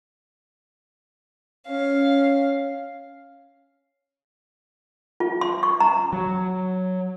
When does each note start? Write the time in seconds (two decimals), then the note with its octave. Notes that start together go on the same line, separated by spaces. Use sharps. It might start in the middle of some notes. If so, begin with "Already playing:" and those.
1.67 C#4 F5
5.20 F4
5.41 C6
5.63 C#6
5.80 A#5
6.13 F#3